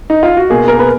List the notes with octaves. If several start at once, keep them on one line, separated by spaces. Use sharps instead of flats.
D#4
F4
F#4
B2 A#3 G#4
A#4
B4